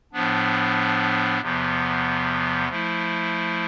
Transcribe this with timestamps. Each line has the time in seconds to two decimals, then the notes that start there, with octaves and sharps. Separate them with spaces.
0.13 A2 F3 B3 D4
1.41 E2 C3 F3 B3
2.68 F3 A3 E4